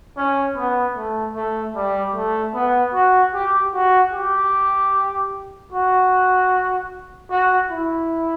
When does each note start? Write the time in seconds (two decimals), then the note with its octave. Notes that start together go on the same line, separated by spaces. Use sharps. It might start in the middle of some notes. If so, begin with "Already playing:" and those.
0.17 C#4
0.56 B3
0.96 A3
1.35 A3
1.75 G3
2.15 A3
2.54 B3
2.94 F#4
3.34 G4
3.74 F#4
4.13 G4
5.72 F#4
7.30 F#4
7.70 E4